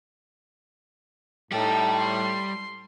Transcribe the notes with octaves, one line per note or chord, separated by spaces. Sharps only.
A2 G3 D#4 A4 G5
C6